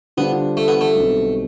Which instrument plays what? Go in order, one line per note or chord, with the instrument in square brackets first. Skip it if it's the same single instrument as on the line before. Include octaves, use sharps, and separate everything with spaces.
[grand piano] D3 G3 D4 F4 C5 [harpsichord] B3
[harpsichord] A3
B3
A3
[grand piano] B1 B2 G3 C4